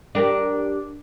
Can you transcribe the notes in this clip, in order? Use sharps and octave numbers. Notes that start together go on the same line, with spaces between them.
D4 G4 A#4